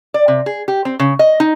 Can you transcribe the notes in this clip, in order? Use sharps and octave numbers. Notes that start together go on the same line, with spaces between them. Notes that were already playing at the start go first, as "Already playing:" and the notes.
D5
C3
G#4
G4
C4
C#3
D#5
D#4